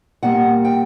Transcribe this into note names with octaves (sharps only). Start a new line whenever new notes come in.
A#2 G3 A#3 F#5
G5